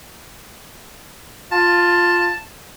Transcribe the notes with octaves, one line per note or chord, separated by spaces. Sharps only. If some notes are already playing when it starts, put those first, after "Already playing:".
F4 A5